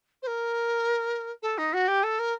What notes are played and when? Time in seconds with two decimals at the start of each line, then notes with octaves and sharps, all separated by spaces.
0.22 C5
0.27 A#4
1.42 A4
1.58 D#4
1.73 F#4
1.88 G4
2.03 A4
2.19 A#4